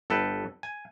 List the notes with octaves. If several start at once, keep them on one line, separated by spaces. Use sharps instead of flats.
G1 A4 B4 G5
G#5